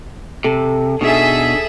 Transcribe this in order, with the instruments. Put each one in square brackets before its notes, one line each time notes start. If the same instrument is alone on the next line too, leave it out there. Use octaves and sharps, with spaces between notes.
[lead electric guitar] C3 [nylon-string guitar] A4
[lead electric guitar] B2 [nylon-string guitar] D4 D#4 [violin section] G#4 A4 E5